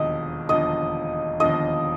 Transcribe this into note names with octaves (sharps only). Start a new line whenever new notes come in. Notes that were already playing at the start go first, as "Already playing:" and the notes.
Already playing: E1 D#2 D3 F3 D#5
E1 D#2 D3 F3 D#5
E1 D#2 D3 F3 D#5